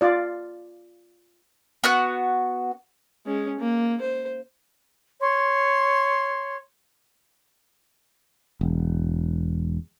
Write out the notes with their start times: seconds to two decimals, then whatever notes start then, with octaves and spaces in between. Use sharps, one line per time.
0.01 F4 D5
1.84 B3 F#4 F#6
3.26 G#3 C#4
3.60 A#3
4.01 C5
5.20 C#5 C6
8.61 E1